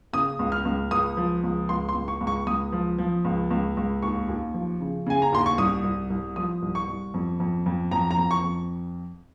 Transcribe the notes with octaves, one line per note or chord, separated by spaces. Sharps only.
C#3 D#6
C#2
F6
C#2
C#2 D#6
F3
C#2
C#2 C6
C6
C#2
C#6
C#2
C#6
C#2 D#6
F3
F3
C#2
C#2
C#2
D#2 C#6
D#2
F3
C#3
C#3 G#5
A#5
D#2 C6
C#6
C2 D#6
C2
C2
F3 D#6
C2
C#6
C2
F2
F2
F2
F2 A#5
A#5
F2
C#6
F2